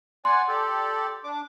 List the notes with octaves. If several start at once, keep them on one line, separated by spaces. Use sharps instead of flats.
D5 F#5 G#5 C6
G4 A4 D5
D4 D6